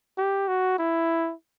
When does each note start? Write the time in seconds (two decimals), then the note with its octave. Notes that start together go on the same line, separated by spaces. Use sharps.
0.18 G4
0.48 F#4
0.79 E4